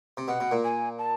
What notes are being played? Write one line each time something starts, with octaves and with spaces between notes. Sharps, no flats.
C3
B2 F#5
B2
A#2
G#5
A5